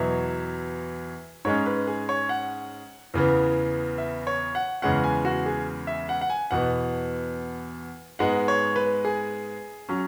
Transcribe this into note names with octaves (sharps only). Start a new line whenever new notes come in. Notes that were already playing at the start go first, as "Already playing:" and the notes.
Already playing: E2 B2 F#3 B3 E5
G#2 G#3 C#4 C#5
B4
G#4
C#5
F#5
E2 C#3 E3 B3
E5
C#5
F#5
E2 C#3 G#3 C#4 F#5
G#5
F#4
G#4
E5
F#5
F#5
G#5
E2 B2 B3 F#5
G#2 G#3 B3 F#5
C#5
B4
G#4
F#3 C#4